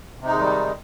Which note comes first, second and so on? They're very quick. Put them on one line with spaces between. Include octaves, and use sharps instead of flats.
C3 D#4 G#3 D#3 G3